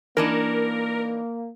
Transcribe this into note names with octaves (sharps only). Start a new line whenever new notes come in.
E3 A#3 D4 D#4 A#4